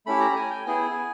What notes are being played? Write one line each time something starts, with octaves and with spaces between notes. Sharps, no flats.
A3 C#4 E4 G4 B5
A#5
G#5
G5
B3 E4 G#4 G#5